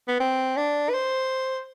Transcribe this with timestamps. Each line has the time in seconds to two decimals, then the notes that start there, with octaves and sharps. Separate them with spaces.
0.08 B3
0.20 C4
0.57 D4
0.89 B4
0.94 C5